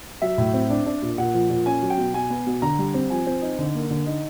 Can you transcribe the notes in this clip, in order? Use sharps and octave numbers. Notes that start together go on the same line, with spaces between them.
F#3 E5
A2
C4
D4
D4
A#2
A#2 F#5
F3
A#2
C#4 G#5
F#3
G5
B2
B2 G#5
B3
B2
D3 A#5
G3
C4
F3 G#5
C4
D#4
D3
A#3
D3
D#4